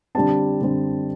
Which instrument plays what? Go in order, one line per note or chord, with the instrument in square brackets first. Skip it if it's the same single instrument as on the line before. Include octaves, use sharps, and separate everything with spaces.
[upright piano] D3 G3 C4 A5
D3 G3 C4